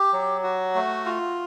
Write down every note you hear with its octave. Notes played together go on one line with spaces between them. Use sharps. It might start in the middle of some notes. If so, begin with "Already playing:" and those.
Already playing: G4
F#3
F#4
A3
F4